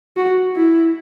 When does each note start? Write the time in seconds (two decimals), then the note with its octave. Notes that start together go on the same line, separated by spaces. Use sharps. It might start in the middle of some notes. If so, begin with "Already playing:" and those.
0.17 F#4
0.56 E4